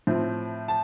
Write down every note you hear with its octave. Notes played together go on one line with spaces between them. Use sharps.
A2 F3 C4
A5